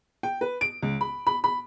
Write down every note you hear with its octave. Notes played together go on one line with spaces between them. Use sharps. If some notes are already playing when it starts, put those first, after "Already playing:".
G5
B4
D7
C#2
B5
B5
B5